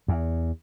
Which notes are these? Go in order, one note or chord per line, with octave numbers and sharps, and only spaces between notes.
E2